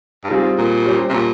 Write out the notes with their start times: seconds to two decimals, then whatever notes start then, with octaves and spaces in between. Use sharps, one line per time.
0.24 G2
0.30 G#2 G3 C4 F4 G#4
0.58 A#2
0.86 G3 C#4 G4 C5
1.10 C3
1.14 A#2